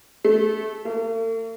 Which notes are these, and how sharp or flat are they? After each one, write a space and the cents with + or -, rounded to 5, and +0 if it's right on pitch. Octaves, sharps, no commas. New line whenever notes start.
A3 -25
A3 +45